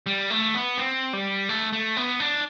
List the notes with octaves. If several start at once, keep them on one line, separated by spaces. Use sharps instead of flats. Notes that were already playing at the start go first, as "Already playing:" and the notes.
G3
A3
B3
C4
G3
A3
A3
B3
D4